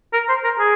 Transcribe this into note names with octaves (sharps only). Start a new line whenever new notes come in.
A#4
C5
A#4
G#4